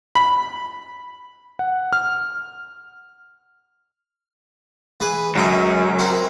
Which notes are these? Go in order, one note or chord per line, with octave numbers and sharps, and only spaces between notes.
B5
F#5
F6
E3 G#4 B4
C#2 F#2 D#5 E5
C4 E4 A#4